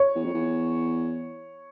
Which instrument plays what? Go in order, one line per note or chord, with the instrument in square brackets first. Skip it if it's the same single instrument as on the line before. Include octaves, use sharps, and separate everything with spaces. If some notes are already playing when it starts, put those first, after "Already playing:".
Already playing: [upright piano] C#5
[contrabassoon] E2
F2
E2